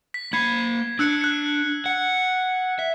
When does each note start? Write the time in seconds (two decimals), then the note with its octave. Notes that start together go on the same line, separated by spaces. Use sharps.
0.14 B6
0.33 A#3 B5 G#6 B6 C7
0.99 D4 E6 F#6 C#7
1.21 F#6 C#7
1.86 F#5
2.79 E5